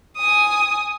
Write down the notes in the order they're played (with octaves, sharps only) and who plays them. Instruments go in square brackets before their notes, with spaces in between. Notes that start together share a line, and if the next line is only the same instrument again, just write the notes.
[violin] G#5 D#6